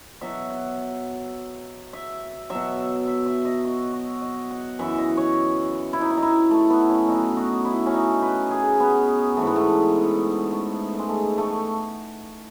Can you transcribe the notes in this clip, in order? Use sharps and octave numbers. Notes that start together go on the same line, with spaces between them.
B2 F#3 E5
F#5
E5
B2 F#3 E5
E5
E5
D#5
F#4
F#4
D#5
F#5
F#2 E3 E5
D#5
C#5
E4
D#4
E4
D#4
E4
A3
B3
C#4
B2 F#3 D#4
F#4
E4
C#4
D#4
B4
G#4
B3
G#2 E3 A3
B3
A3
A3
G#3
A3
A3